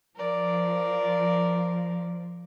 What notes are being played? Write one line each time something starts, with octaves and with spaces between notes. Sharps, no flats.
F3 A#4 D5